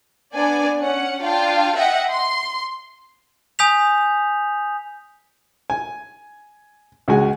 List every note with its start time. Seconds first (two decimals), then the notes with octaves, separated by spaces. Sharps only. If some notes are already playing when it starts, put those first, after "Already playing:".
0.34 B3 D4 D5 G#5
0.80 C#4 F#5
1.22 D4 F4 F5 G5
1.75 D#5 E5 F#5 G5
2.08 C6
3.59 G#5 D#6 G6 B6 F7
5.70 G#5
7.08 C#2 G#3 F#4 G#5